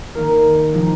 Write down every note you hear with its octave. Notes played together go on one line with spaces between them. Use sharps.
D#3 A#3 D#4 A#4
C3 F3 G#3 D#4